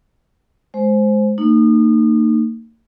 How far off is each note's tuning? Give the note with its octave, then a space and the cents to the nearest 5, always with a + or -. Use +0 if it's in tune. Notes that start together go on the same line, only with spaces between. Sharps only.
G#3 +20 C5 +0
A#3 -40 D#4 -30